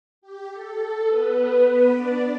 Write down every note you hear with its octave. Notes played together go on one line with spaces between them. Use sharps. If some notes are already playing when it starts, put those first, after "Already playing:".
G4
A4
B3 B4
B3 B4
D4 D5